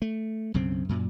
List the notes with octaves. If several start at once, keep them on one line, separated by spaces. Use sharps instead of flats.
A3
B1 F#2 C#3 C4
F#2 A#2